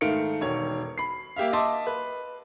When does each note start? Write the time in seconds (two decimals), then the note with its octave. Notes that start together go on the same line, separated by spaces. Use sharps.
0.01 G#2 D#3 A3 F5 C#7 D7
0.41 E1 D#3 C#5
0.98 B5 C7
1.36 A#3 G4 E5 F5
1.53 D#5 E5 A5 C6 D6
1.87 B4